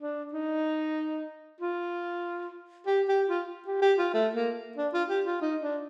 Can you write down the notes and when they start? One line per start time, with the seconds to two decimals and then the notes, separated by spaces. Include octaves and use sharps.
0.01 D4
0.33 D#4
1.60 F4
2.87 G4
3.08 G4
3.29 F4
3.67 G4
3.82 G4
3.98 F4
4.14 A3
4.35 A#3
4.77 D4
4.93 F4
5.09 G4
5.25 F4
5.41 D#4
5.63 D4